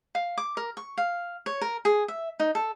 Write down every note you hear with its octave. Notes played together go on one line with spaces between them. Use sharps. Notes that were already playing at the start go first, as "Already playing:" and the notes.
F5
D6
A#4
C#6
F5
C#5
A#4
G#4
E5
D#4
A4